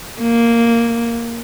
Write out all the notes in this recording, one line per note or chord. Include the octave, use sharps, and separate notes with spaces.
A#3